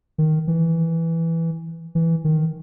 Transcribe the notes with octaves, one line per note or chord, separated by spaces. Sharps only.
D#3
E3
E3
D#3